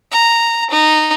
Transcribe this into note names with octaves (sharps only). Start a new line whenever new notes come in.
A#5
D#4